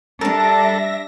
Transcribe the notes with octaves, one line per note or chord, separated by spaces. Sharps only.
G3 D4 A4 A#4 E5 A5 A#6